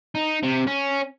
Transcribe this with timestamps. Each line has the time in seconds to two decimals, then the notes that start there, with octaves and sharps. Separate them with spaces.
0.15 D#4
0.43 C3
0.67 C#4